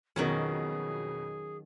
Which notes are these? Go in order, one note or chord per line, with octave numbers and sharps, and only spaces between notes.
F2 B2 D#3 F#3 C#4 G#4 D#5